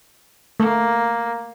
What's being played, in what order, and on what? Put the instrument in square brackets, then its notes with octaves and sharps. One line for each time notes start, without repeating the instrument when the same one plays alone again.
[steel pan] A3 [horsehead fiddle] A#3